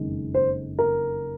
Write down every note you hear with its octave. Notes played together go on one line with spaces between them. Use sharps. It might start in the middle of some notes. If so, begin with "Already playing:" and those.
Already playing: F#1 F2 D#3 G#3
C5
A#4